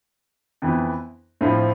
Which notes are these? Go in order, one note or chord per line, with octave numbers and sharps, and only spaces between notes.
F2 E3 B3 E4
A2 F3 C4 E4